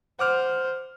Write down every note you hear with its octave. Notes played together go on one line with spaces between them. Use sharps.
C5 F#5 D6 F6